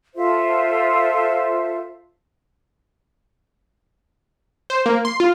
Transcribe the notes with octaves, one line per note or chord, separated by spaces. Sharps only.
F4 A4 C5 E5
C5
A#3
C6
F4